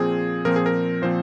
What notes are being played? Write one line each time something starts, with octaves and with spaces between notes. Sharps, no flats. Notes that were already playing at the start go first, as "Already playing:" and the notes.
Already playing: A#2 F3 C4 G#4
A#2 F3 C4 A#4
G#4
A#4
A#2 F3 C4 C5